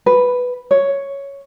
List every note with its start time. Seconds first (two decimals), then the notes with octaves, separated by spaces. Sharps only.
0.06 B4
0.71 C#5